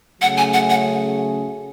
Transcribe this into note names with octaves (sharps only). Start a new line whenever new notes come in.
C#3 F#3 A3 C#4 G#4 F#5
G#5
F#5
F#5